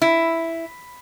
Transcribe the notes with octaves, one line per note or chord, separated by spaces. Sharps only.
E4